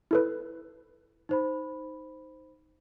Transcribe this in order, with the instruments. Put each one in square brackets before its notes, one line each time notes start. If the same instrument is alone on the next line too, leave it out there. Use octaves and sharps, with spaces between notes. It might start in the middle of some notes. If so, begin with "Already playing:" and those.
[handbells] E4 A4 B4
[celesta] D#4 C5 B5